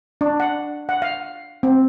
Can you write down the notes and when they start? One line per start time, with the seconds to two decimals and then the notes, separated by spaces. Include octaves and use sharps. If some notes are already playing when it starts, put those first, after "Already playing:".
0.21 D4
0.40 F#5
0.89 F#5
1.02 F5
1.63 C4